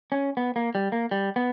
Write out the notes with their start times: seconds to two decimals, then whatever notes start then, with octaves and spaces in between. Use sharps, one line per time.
0.12 C#4
0.37 B3
0.56 A#3
0.75 G3
0.92 A#3
1.11 G3
1.36 B3